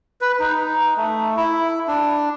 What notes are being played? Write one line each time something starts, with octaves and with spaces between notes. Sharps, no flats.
B4
D#4
D#4
A3
E4
D4